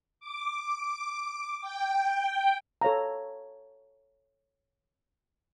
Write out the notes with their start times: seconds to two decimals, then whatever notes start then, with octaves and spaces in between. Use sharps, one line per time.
0.20 D6
1.61 G5
2.82 A4 C#5 F5 A#5